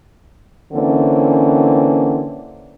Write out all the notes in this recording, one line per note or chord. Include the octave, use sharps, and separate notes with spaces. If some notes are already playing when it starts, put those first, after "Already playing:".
D3 E3 A#3 C4 C#4